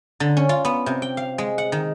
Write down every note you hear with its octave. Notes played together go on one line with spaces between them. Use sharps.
D3
C#4
F4
B3
C3
G5
F5
G#3
F#5
D#3